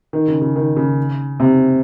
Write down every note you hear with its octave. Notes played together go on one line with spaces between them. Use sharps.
D#3
C#3
C#3
D#3
C#3
C3